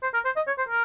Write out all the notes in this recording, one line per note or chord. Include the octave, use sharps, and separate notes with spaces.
C5
A#4
C5
D#5
C#5
C5
A#4